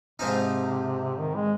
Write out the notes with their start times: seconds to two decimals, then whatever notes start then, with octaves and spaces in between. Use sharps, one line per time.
0.19 G#2 C3 F3 C4 D#4
1.18 D#3
1.35 G#3